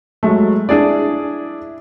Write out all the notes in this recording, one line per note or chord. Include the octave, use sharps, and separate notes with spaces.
F#3 G#3 A3
D4 E4 G#4 D5